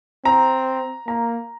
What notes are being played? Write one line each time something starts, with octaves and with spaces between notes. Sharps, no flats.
C4 A#5
A#3 A#5